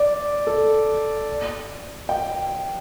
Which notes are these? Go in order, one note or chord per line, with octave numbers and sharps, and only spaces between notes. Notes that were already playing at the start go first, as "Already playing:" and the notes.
Already playing: D5
A4
G5